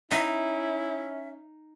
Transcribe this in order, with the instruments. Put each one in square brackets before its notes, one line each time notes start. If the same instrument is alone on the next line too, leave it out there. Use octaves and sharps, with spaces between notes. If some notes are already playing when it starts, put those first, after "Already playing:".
[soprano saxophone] C#4 [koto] D#4 [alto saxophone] E4 [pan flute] E5